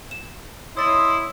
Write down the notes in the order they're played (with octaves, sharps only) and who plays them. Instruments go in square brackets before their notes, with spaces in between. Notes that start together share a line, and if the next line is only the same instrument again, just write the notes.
[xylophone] E7
[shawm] E4 [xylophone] C#5 A6 [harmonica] D#5 C6 [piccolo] D#6